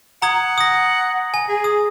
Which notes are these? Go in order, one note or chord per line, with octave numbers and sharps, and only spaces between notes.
F#5 A#5 D#6 G#6
D#6 A#6
G#5
G#4
D#6